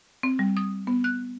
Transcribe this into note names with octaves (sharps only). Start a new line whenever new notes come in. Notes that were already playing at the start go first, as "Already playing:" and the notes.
C4
G3
D#6
B3
F#6